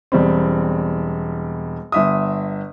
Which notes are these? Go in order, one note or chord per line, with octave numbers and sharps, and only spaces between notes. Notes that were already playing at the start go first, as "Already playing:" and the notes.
E1 G3 C4
G1 E5 D#6